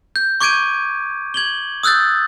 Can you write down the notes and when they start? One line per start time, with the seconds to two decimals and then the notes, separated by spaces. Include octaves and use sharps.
0.16 G6
0.41 C#6 D6 G6 G#6 D7 D#7
1.34 G#6 F#7 G7
1.83 D#6 E6 F#6 G6 A6